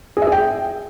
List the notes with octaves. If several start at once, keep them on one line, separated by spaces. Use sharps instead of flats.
G#4
E5
G#4
G5